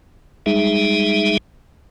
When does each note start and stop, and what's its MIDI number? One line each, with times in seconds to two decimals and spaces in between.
0.46 1.37 55
0.46 1.37 56
0.46 1.37 63
0.46 1.37 68
0.46 1.37 76